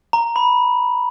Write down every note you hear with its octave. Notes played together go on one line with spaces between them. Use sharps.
A#5
B5